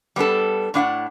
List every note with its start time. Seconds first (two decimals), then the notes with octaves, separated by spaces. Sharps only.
0.16 G3 B3 D4 A4
0.74 A2 D4 F5 F#5